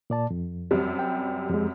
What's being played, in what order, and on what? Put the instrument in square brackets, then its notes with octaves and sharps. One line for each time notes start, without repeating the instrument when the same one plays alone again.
[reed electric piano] A#2 D5 A5
F2
[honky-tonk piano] F#2 C3 G3
[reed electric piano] G5
F2 G#3